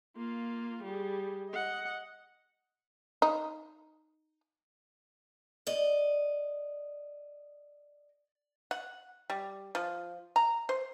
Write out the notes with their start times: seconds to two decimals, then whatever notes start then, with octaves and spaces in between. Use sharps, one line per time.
0.17 A#3 F4
0.83 G3 G#4
1.50 D#5 F#5
3.22 D#4
5.67 D5 D#5
8.71 F#5
9.30 G3
9.75 F3
10.36 A#5
10.69 C5